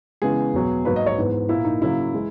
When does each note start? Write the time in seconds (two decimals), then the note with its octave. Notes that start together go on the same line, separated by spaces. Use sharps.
0.22 C#3 E3 G#3 B3 G#4
0.54 E2 B2 F#3
0.85 G#2 F#3 A#3 B4
0.96 D#5
1.06 C#5
1.18 G#2 E3 B3
1.49 A#2 A#3 E4
1.65 D#4
1.81 C#3 F#3 A#3 E4
2.14 E3 G#3